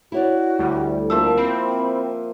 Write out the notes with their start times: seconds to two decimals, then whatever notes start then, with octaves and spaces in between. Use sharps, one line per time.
0.12 E4 F#4 C#5 D5
0.59 D2 G3
1.10 F3 A#3 E5 A5
1.37 C4 B5